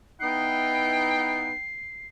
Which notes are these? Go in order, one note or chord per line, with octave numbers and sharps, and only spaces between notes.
B3 D#4 E4 G5 C7